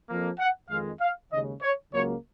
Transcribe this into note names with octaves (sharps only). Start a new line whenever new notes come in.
F2 F3 A#3
F#5
F2 D#3 G#3 F5
F5
D#2 C#3 G#3 D#5
C#5
C#2 C#3 F#3 A#3 C#5